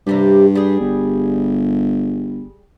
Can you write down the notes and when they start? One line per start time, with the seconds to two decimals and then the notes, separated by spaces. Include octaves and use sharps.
0.07 G2 C3 G3 G4
0.55 G3 G#4
0.81 G1